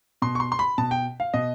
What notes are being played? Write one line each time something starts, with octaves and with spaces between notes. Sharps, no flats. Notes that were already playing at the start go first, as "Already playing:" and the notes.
B2 C6
C#6
C6
C6
B5
B2 A5
G5
F5
B2 D#5